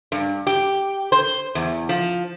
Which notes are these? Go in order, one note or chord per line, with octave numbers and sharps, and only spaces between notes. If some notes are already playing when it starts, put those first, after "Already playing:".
G2
G4
C5
E2
F3